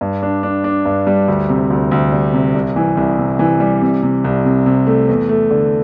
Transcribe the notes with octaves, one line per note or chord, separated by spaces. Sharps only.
G2
D4
D4
D4
G2
G3
D2
C3
D2
D2
G3
C3
C2
E3
C2
C3
E3
G3
C3
C3
C2
C3
C3
A3
E2
A3
D3